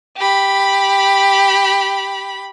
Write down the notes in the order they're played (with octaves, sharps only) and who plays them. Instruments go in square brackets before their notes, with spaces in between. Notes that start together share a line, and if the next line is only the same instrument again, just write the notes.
[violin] G4 B5